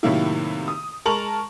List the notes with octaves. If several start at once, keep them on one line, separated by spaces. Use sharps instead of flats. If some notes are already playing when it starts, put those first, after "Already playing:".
A2 C3 D#3 F#3 A#3 E4
D#6
G#3 A#4 A5 C#6 F7 F#7